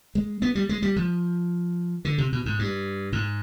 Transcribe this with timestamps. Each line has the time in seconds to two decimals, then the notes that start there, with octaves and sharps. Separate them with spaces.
0.15 G#3
0.42 B3
0.55 G3
0.69 G#3
0.82 G3
0.96 F3
2.05 D3
2.18 C3
2.32 B2
2.46 G#2
2.59 G2
3.13 G#2